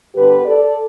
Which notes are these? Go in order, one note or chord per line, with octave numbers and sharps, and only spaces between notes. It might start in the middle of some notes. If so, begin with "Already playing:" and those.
G2 D3 B3 G4 B4
A4 D5